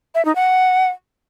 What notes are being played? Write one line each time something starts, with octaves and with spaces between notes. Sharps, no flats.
E5
D#4
F#5